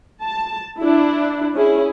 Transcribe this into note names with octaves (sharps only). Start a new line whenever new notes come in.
A5
D4 E4
C#4 E4 G#4